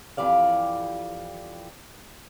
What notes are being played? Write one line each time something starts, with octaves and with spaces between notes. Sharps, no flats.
F2 E3 G4 D5 F5